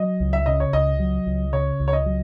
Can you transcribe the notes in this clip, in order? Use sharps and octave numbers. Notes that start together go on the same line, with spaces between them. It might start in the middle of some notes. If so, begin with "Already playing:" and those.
Already playing: F#3 D#5
C#2
E5
C#3 D#5
C#5
C#2 D#5
F#3
C#2
C#3 C#5
C#2
C#5
D#5
F#3